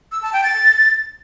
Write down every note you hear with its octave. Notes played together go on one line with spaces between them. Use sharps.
E6
A5
G5
A6